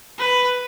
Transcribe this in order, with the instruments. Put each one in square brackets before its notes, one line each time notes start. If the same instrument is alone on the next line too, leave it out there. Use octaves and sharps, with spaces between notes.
[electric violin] B4